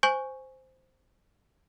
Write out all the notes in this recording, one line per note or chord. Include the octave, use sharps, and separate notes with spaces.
C5 G#5 C#6 G6 F#7